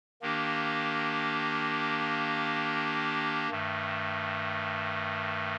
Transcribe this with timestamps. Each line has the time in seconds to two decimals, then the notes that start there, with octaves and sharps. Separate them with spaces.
0.22 D#3 A#3 D4 G4
3.50 G2 D#3 A3